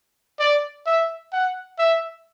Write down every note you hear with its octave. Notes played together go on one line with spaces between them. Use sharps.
D5
E5
F#5
E5